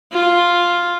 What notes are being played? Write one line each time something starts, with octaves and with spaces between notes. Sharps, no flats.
F4